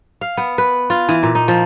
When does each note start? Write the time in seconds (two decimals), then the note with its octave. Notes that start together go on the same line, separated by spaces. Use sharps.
0.21 F5
0.37 B3
0.58 B4
0.90 F4
1.09 E3
1.23 A#2
1.35 D#4
1.48 F3